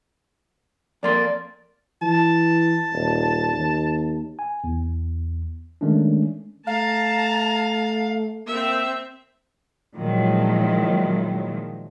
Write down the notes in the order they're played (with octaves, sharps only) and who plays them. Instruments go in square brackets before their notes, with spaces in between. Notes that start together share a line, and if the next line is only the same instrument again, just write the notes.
[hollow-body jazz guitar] F2 A#3 C6 [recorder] D5
[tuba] E3 [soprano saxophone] A5
[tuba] D#1
D#2
[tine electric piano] G#5
E2
D#3 G#3 A3 C#4 D4
[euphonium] A3 [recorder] F5 [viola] A5 A#5
[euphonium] A#3 [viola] C4 E5
[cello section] A#2 D#3 F3 F#3 G#3 E4